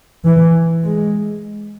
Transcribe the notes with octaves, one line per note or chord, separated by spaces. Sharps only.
E3
G#3